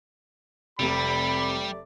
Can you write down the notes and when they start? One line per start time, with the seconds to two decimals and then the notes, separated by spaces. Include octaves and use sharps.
0.79 F1 C3 G3 A3 G4 D5 B5